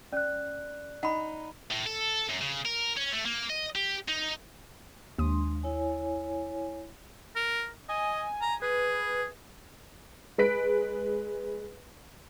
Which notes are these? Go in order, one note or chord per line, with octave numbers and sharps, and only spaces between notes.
C#4 D5 F#6
D#4 F#5 B5
A2
A4
F#2
C#3
A#4
C#4
A3
A#3
D#5
G4
D#4
D#2 G#3 D4 C6 D#6
E4 C#5 G#5
A#4
D#5 G#5
A#5
G#4 B4
G#3 B4 B6 D7